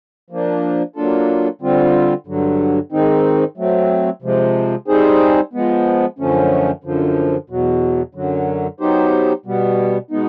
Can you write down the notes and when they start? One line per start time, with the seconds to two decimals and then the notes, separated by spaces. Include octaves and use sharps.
0.30 F3 A#3 D4
0.96 F#3 A#3 D4 F4 A4
1.61 D3 G3 C4 F4
2.27 G2 D3 F#3
2.92 G#2 D#3 G#3 C4 D#4
3.57 F#3 A3 C4
4.22 C3 F3 G#3
4.88 G3 C4 D#4 G#4 C5
5.53 F3 G#3 B3
6.19 F#2 D3 F3 A3 C#4
6.84 F#2 D3 F3
7.50 E2 B2 F#3
8.15 F#2 D3 F#3
8.80 F#3 B3 D#4 G4 C5
9.46 B2 G3 B3
10.11 B2 G#3 B3 D#4